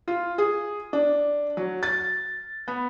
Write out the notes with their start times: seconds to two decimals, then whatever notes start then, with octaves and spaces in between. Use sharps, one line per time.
0.08 F4
0.38 G#4
0.93 D4
1.57 F#3
1.83 A6
2.68 B3